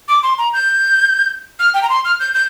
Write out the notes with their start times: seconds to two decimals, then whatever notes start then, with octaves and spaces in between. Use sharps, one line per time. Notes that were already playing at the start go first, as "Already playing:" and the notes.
0.08 D6
0.23 C6
0.38 A#5
0.53 G6
1.59 F6
1.74 G5
1.83 A#5
1.90 C6
2.05 F6
2.20 G6
2.34 G6